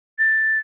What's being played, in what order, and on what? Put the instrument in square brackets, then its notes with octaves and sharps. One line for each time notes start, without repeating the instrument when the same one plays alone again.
[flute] A6